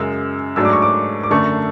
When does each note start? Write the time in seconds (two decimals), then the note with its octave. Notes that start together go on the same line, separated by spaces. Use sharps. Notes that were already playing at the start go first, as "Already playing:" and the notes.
Already playing: F#2 C#3 G#3 E6
0.56 G#2 F#3 A3 D4 E6
0.65 D6
0.73 C#6
0.82 D6
1.23 D6
1.30 F#2 D3 A3 C#6